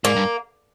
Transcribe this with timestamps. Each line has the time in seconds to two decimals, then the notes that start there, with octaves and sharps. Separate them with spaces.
0.04 G#2 A#3
0.16 G2